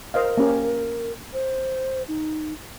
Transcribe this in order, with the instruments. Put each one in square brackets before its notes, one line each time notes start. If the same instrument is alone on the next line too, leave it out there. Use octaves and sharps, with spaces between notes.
[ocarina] A#4 [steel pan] C5 D#5 F5
[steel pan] A#3 C#4 G4
[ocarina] C5
D#4